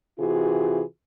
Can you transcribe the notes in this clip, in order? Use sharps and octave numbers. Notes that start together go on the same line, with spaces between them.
C3 E3 F4 F#4 G#4